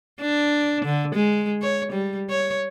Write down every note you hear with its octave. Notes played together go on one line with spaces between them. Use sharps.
D4
D3
G#3
C#5
G3
C#5